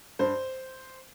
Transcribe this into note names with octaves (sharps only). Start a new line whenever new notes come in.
G2 C5